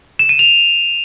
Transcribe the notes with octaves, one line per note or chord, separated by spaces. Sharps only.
E7
D#7
F7